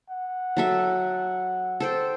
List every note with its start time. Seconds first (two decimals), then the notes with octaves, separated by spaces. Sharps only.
0.10 F#5
0.57 F#3 A4 E5
1.80 A4 C5 G5